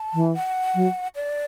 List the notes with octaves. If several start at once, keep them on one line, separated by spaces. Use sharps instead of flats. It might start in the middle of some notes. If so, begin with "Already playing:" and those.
Already playing: A5
E3
F#5
F#3
D5